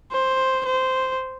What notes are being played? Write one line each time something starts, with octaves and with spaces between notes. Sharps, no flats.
C5
C5